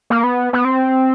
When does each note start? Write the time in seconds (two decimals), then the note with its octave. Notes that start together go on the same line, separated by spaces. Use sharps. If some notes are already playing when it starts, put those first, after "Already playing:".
0.10 A#3
0.24 B3
0.53 B3
0.65 C4